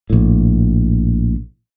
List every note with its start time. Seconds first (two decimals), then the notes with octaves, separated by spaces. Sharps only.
0.10 A#1 A2